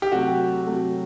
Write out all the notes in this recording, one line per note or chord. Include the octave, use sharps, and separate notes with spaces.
G4
C3 F#3 A3 F#4
C3 F#3 A3